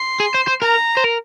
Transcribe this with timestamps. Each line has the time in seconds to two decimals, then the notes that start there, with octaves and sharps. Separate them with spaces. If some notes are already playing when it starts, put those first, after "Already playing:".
Already playing: C6
0.20 G#4
0.34 C5
0.47 C5
0.62 A#4 A#5
0.97 C5
1.04 A#4